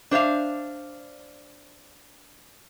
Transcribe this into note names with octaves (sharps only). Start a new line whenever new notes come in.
D4 C5 E5 F5